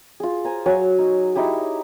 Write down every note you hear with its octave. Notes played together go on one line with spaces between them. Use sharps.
F4 G#4
C5 G#5 A#5
F#3 C#5 G#5
D#4
D#4 E4 G4 G#4